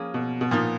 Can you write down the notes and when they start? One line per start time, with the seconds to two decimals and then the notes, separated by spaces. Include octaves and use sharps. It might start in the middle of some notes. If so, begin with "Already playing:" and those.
Already playing: F3 A#3 C#4 G#4
0.14 B2
0.41 B2
0.51 A#2 F3 B3 D#4